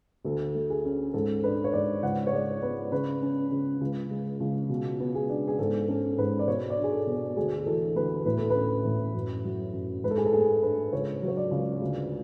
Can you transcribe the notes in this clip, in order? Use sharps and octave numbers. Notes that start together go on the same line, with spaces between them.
D2 A4
A3
G#4
C#4
G#2 A4
D4 B4
C#5
G#2 D5
C#2 F#5
C#5
G#3 D5
B3 B4
C#3 B4
C#4
C#3
C#2
G#3
C#2
B2
B3
G#4
D4
G#4
G#2 A4
C#4 A4
G#2 B4
D5
B2 C#5
D5
D4
G#4
A4
B2
A4
D2 G#4
E3 A4
D2 B4
A2 B4
A4
B4
C#4
A2
F#2
F#3
F#2
G#2 B4
A4
G#4
A4
A3 G#4
D4 B4
C#2 C#5
F#3
C#5
D5
C#2
D2